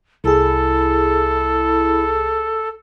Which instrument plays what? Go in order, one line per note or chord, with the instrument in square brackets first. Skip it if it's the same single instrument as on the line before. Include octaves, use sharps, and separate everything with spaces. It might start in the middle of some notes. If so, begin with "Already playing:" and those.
[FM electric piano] C2 G#4 [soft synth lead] E4 [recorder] A4